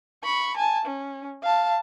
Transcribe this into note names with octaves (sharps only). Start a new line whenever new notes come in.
B5 C#6
G#5 A5
C#4
F5 A5